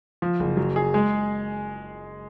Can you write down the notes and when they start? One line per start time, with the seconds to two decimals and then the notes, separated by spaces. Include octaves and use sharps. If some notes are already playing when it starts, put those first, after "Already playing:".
0.22 F3
0.40 F#1
0.57 F#3
0.76 G#4
0.94 G#3